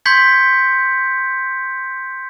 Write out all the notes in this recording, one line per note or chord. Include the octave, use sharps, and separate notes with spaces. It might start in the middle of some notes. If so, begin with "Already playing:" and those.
C6 C#6 G6 G#6 B6 C#7